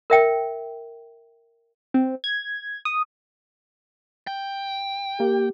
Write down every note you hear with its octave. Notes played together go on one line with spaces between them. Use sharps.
A#4 E5 G5
C4
G#6
D#6
G5
A#3 G4